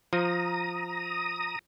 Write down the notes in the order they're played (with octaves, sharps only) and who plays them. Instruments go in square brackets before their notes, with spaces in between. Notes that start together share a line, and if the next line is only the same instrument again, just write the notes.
[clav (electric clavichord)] F3 [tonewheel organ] A#5 D#6